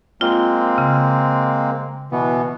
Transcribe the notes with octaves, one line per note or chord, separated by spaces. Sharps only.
G#3 A#3 C4 F4
C#3
B2 E3 B3